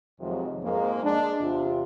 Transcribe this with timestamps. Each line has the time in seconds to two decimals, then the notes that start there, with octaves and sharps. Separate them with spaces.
0.20 F2 C3 D#3 F3 F#3 G#3
0.63 F2 G#2 G#3 A#3
1.03 G#3 D4
1.41 E2 C3 F4